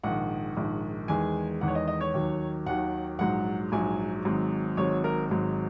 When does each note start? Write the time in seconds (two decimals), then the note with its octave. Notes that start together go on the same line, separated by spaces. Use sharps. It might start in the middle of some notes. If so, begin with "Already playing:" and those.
0.03 A#1 G#2 D#3 F#5
0.57 A#1 G#2 D#3
1.08 E2 D#3 G#3 G#5
1.61 E2 D#3 G#3 F#5
1.68 C#5
1.75 D#5
1.88 D#5
2.01 C#5
2.14 D#2 D#3 F#3
2.66 D#2 D#3 F#3 F#5
3.19 A#1 G#2 F#3 F#5
3.72 A#1 G#2 F#3 G#5
4.25 G#1 G#2 F#3
4.77 G#1 G#2 F#3 C#5
5.04 A#4
5.30 G#1 G#2 F#3